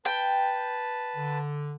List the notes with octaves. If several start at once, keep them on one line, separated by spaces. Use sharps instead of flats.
B4 G5 A5
D3